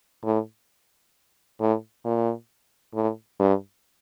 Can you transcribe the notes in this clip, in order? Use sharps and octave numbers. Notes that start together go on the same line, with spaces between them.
A2
A2
A#2
A2
G2